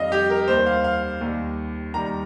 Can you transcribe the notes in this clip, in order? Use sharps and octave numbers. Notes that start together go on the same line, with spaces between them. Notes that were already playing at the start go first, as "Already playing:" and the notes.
Already playing: F2 D#3 G3 D#5 F5
G4
A#4
D#2 D#3 G3 C5
F5
F5
D#2 D#3 G3
D#2 D#3 G3 A#5